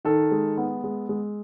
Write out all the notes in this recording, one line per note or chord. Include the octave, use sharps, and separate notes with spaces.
D#3 A4
G#3
B3
G#3
G#3